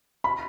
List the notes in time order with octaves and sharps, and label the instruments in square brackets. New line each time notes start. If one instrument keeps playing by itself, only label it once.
[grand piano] B5